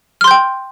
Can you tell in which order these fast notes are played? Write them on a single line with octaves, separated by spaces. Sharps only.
F6 C6 G6 G5